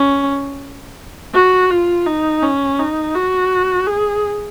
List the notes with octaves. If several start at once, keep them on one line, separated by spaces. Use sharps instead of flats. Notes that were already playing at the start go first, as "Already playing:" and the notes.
Already playing: C#4
F#4
F4
D#4
C#4
D#4
F#4
G#4